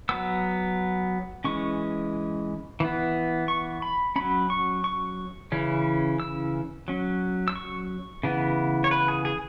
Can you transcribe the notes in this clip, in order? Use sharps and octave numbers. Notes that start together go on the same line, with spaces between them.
F#3 B3 E6
E3 G#3 C#4 C#6
E3 B3
C#6
B5
F#3 C#4 B5
C#6
C#6
C#3 E3 C#4
E6
F#3 C#4
E6
C#6
C#3 E3 B3
C#5
B4
G#4
G#4